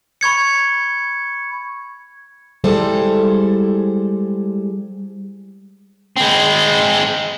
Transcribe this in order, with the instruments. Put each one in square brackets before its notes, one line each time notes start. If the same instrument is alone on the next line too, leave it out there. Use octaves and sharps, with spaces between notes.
[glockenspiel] B5 C#6 G#6 C#7
[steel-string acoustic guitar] G3 G#3 E4 G#4 A4 C5
[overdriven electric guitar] G#3 C4